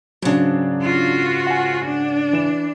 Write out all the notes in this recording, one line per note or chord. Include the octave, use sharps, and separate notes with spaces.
G#2 C#3 F#3 D4
F4 F#4
F#5 G#5
D4
E3 E7